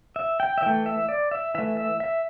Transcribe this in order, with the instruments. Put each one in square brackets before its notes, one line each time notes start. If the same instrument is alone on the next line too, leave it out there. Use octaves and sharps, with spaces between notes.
[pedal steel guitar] E5
G5
E5
E3 A3 G5
E5
D5
E5
E3 A3 E5
E5
E5